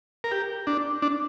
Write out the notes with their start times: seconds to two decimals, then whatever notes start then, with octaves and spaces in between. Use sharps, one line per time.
0.24 A#4
0.31 G4
0.67 D4
1.02 D4